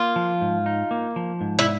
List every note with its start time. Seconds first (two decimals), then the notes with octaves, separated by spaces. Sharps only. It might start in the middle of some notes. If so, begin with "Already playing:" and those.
Already playing: A#3 F4
0.16 F3
0.41 G#2
0.66 D#4
0.91 A#3
1.16 F3
1.41 G#2
1.59 E4